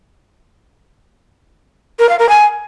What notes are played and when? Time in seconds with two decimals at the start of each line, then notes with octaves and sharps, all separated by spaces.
1.99 A#4
2.09 F5
2.19 A#4
2.29 G#5